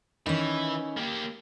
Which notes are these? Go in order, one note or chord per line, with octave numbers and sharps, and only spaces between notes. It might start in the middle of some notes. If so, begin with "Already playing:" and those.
D#3 E3 C#4
A#3 G4